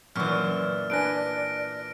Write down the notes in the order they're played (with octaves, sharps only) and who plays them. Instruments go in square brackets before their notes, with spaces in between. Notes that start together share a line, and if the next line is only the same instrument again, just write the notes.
[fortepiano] F#2 C#6 [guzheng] A#2 E3 [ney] D5 [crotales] F6
[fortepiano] D4 B4 G#5 [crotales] A#6 D7